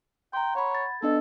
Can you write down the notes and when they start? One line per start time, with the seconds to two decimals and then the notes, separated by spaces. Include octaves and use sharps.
0.33 G5 A#5 C6
0.55 C#5 F#5 B5
0.72 G#6 A6
1.02 B3 D4 A4 D#5